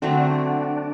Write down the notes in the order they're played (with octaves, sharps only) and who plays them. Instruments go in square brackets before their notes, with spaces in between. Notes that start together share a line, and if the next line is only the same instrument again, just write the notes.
[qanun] D3 F#3 A3 C4 [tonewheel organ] D4